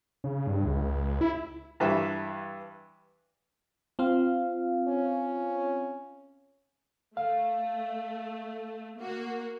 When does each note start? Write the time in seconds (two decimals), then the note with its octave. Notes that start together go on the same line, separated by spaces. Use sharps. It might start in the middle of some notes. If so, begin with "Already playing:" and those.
0.24 C#3
0.47 G2
0.64 C#2
1.21 E4
1.80 G2 E3 E5
3.99 C4 F4 F5
4.88 C#4
7.17 A3 F5
8.97 A#3 F#4